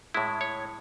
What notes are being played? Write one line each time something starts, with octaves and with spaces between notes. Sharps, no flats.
A2 G#3 E4
C#5